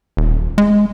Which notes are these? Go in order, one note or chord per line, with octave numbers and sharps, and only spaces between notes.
D#1
G#3